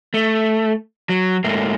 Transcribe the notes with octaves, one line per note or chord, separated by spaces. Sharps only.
A3
F#3
G#2 A3 A#3